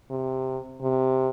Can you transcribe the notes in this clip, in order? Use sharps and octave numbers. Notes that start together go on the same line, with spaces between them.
C3
C3